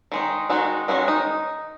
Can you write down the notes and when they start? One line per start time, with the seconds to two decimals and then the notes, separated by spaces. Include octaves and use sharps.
0.12 D#3 G#3 D#4
0.50 D#3 G#3 D#4 F#4
0.88 D#3 G#3 C#4 F#4
1.08 D#4